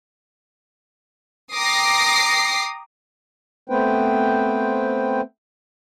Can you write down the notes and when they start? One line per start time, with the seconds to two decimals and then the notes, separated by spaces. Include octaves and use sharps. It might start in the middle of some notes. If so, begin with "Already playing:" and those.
1.53 G5 A#5 D6 D#6 A#6 C7
3.69 A3 B3 C4 B4 C5 G5